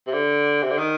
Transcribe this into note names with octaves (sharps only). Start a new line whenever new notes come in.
C3
D3
C3
D3
D#3